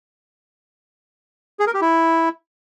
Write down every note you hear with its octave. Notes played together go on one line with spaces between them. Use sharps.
G#4
A#4
G4
E4